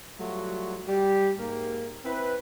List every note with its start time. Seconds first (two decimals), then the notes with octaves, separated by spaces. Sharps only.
0.19 F#3 G3 A3 F4 F#4
0.87 G3 G4
1.38 G#2 A#3
2.05 C4 E4 B4